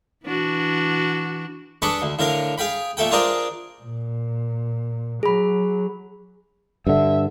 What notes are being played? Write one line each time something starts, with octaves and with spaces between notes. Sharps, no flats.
E3 D4 F#4
D4 G#4 A4 B4 B5 C#6
D2
A2 D3 A#4 F5
G#4 F5 G5 B5
A#2 A3 A4 G5
D4 F4 G#4 A#4 C5 D5
A#2
F#3 G#4 B5
G2 D3 E5